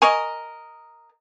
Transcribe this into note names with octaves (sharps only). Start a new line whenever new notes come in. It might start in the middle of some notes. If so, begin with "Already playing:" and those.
A#4 D#5 G#5 A#5 C#6